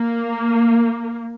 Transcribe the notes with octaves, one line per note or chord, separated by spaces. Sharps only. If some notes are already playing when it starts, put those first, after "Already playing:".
Already playing: A#3